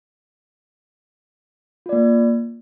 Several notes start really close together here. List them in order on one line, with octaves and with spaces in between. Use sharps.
F4 D5 A#3